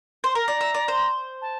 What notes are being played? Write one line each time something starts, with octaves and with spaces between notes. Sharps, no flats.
C5
A#4 A#5
D5
E5
D5
C5
A5